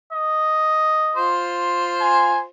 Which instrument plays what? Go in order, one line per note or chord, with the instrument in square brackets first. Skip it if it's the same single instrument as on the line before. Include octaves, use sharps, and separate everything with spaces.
[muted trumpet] D#5
[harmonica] F4 C5
[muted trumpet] G#5